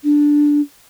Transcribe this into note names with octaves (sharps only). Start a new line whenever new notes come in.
D4